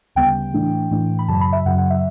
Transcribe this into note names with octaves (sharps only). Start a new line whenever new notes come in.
D2 C#3 G3 B3 G5
A2 E3 A3 D4
A2 E3 A3 D4
B5
F#2 C#3 F#3 A5
B5
E5
F#2 C#3 F#3 F#5
F#5
E5